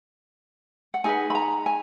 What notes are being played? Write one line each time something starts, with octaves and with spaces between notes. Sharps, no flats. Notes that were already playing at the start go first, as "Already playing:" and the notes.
F#5
D#4 G#4 B4 G#5
B5
A#5
G#5